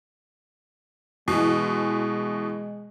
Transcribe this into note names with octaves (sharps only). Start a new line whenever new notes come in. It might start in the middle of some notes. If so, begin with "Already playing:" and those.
B2 E3 G#3